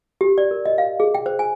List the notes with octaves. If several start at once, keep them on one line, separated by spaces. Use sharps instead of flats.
G4
D5
A#4
D#5
F5
G#4
G5
C5
G#5